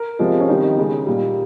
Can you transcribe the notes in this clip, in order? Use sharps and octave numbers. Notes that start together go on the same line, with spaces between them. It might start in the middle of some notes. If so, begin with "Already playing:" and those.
Already playing: A#4
C3 F3 G#3
C#4
C3 D#3 G3 D#4
C#3 G#3
A#2 G3